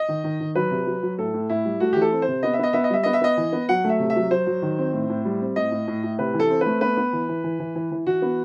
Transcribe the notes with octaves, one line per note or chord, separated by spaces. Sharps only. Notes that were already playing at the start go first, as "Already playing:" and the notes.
Already playing: D#5
D#3
D#3
D#3
F#3 B4
C3
F#3
F#3
A2 A4
A2
A2 E4
G3
A3 F#4
E3 G4
A4
C4
C5
C3
B3 D#5
E5
B3 D#5
B3 E5
D#5
G3 E5
B3 D#5
E5
B3 D#5
E3
B3
F#3 F#5
A3
E5
C3
E5
F#3
F#3 C5
F#3
D#3
C4
A2
A2
G3
C4
A2 D#5
A2
A2
A2
C3 B4
E3
A4
C4
B4
A3
B3 B4
B3
E3
E3
E3
E3
E3
E3
E3 F#4
B3